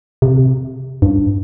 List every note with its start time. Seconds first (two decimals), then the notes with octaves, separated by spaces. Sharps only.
0.22 C3
1.02 G2